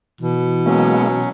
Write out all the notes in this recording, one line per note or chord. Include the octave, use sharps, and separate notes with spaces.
B2 E3
F#3 G#3 A#3 B3 C#4